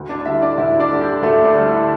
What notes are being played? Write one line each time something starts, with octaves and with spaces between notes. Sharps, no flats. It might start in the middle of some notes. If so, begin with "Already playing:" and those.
Already playing: D2
D4 D5
D3 G3 E4 E5
D4 D5
D2 E4 E5
D4 D5
D3 G3
G4
D2 A3 A4
D4 D5
D3 G3
E4